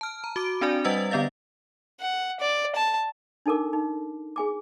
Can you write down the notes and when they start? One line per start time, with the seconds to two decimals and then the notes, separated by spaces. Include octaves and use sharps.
0.01 A5 F6
0.24 A#5
0.36 F#4 D6 D7
0.61 C4 D4 F#4 D5 G#5
0.84 G3 B4 D#5 F#5 E6 A6
1.11 D3 B3 D5 F5 A6
2.01 F#5
2.40 D5
2.75 A5
3.46 D4 D#4 A4 A#4 D6
3.73 D#4
4.36 G#4 G#5 D6